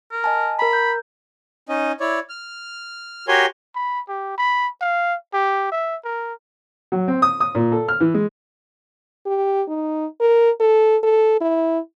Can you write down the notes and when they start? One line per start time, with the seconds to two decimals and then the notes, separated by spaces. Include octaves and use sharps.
0.11 A#4
0.24 D#5 G#5 A5
0.59 A#4 A#5 B5
0.73 G6
1.69 C#4 D#4 D#5
2.00 E4 C#5 D5
2.30 F6
3.28 F#4 G4 A#4 C#5 G#5 C6
3.75 B5
4.08 G4
4.38 B5
4.81 F5
5.33 G4
5.72 E5
6.04 A#4
6.92 F#3
7.08 C4
7.22 D#6
7.40 D#6
7.55 A#2
7.72 A4
7.88 F6
8.00 E3
8.14 G#3
9.26 G4
9.68 D#4
10.21 A#4
10.60 A4
11.03 A4
11.41 E4